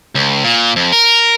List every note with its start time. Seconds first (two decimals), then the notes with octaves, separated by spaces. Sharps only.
0.15 C#2
0.44 A#2
0.76 F2
0.92 A#4